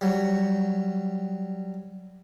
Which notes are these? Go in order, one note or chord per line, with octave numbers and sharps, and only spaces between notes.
F#3 G3